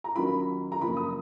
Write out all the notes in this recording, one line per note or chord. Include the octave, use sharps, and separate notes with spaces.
A#5
D#2 D#3 F#3 C#4 F4 B5
A#5
F#2 C#3 F3 A#3 B5
D#6